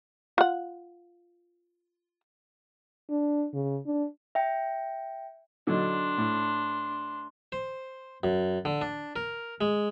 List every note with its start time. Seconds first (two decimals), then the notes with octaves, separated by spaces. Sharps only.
0.38 F4 F#5
3.10 D4
3.53 C#3
3.86 D4
4.35 E5 G5
5.67 D3 F#3 D4 D#4 C6
6.18 A2
7.52 C5
8.24 F#2
8.65 D3
8.81 D4
9.16 A#4
9.61 G#3